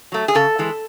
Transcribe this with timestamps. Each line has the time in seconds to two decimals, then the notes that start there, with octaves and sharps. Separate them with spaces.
0.12 F#3 A3
0.28 G#4
0.35 C#3 A4
0.59 E3 G#3